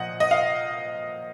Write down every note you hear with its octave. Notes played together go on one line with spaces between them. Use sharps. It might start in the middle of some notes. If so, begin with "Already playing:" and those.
Already playing: A#2 F3 D#5 F#5
D#5
F5